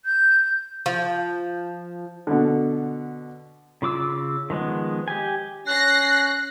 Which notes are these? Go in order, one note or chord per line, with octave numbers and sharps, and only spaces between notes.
G6
F3
B2 D3
C#3 F4 D6 E6
D#3 F3 G#3 B3
G4 G#5
C#4 F#6 A#6 C7